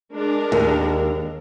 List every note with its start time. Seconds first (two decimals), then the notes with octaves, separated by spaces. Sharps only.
0.14 G#3 D4 A#4
0.52 D#2